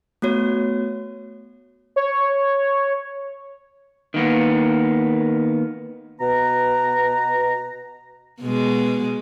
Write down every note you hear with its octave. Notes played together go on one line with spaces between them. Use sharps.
A3 B3 F#4 C#5
C#5
D#3 A#3 B3
B2 B4 A#5
B2 G#3